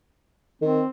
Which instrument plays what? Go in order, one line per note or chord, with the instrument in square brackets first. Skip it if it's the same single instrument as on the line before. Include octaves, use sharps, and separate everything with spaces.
[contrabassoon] D#3 [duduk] C4